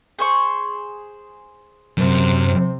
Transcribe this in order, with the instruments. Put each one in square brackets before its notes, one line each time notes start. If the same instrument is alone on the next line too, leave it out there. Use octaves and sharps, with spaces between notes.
[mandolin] G#4 C5 C#6
[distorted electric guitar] F#2 [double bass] C3 C4